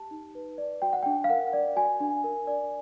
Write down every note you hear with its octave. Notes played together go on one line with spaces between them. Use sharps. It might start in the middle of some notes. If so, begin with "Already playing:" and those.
Already playing: G4 A5
D#4
B4
D5
F#4 G5
F#5
D4 G5
F5
A#4 F#5
D5
F#4 G#5
D4
A#4
D5